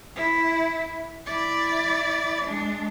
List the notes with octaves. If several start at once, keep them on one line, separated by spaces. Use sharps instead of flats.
E4
E4 D5
G#3 D4